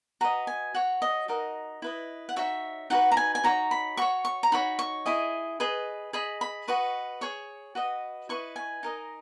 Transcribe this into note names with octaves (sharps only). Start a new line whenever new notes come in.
F#4 B4 D#5 A#5
G#5
F#4 C#5 F#5
D#5
D#4 F#4 A#4 D#5
E4 B4 D#5
F#5
D#4 F#4 C#5 E5
D#4 F#4 B4 F#5
A#5
G#5
G#5
D#4 F#4 C#5 A#5
B5
F#4 C#5 C#6
C#6
A#5
D#4 F#4 C#5 B5
C#6
E4 G#4 D#5
G#4 B4 D#5
G#4 D#5 B5
B5
F#4 B4 D#5 C#6
G#4 C#5 C#6
F#4 B4 D#5
E4 B4 D#5 C#6
G#5
D#4 A#4 D#5